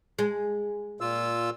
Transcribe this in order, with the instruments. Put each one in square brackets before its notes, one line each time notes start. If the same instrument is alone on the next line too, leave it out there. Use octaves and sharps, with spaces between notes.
[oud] G#3
[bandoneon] A#2 F4 E6